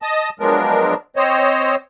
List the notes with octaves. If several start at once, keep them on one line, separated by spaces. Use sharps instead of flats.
D#5 A5 D#6
F3 F#3 G#3 B3 D4 A#4
C4 C5 C#5 D#5